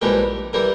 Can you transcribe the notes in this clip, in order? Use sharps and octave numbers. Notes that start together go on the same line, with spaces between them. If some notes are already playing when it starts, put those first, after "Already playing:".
A#1 G#2 E3 G3 G4 A#4
E3 G3 G4 A#4